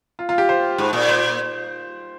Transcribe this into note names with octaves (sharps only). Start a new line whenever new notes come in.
F4
F4
G4
C5
G#2
A#2
C5